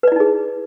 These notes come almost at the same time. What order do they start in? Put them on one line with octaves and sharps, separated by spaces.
B4 D5 E4 D#4 G#4